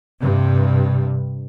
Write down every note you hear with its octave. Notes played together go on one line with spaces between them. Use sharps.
G2 C3